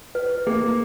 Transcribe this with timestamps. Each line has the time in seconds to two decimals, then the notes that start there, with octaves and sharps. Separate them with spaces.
0.15 B4
0.47 A#3 G#4